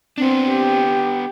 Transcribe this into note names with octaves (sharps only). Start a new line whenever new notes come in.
B3 C4 D4
G4